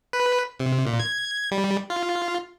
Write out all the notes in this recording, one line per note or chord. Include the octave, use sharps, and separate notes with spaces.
B4
C3
A#2
G#6
G3
F4